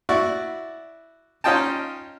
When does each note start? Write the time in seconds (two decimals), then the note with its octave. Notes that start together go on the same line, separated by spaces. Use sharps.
0.09 E4 F#4 D5 C#6
1.44 C#4 D#4 F4 D#5 G5 A5